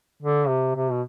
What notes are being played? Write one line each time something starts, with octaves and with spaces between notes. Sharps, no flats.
D3
C3
C3
B2